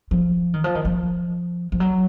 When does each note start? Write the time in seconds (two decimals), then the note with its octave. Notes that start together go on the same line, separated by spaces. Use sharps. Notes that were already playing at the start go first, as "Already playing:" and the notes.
0.11 F3
0.54 D#3
0.64 F3
0.75 D#3
0.85 F3
1.72 F3
1.80 F#3